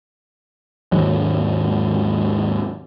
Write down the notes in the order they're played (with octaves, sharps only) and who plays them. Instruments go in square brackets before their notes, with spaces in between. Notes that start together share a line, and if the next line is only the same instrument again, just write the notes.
[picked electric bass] D#2 G#2 F#3 G#3